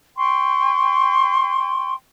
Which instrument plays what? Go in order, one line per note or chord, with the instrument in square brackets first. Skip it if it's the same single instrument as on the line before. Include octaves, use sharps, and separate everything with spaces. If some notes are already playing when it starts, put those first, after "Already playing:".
[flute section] G5 C6 C#6